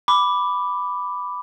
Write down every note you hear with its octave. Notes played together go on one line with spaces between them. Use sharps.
B5 D6